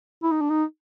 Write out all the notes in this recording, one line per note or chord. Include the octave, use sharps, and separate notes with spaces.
E4
D#4
D4
D#4